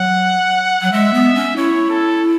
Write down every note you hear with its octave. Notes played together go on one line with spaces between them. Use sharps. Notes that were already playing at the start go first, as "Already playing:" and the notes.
Already playing: F#3 F#5
F#3
G#3 E5
B3
C#4
E4 C#5
A4